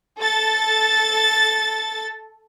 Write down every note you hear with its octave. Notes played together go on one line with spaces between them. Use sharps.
A4 A6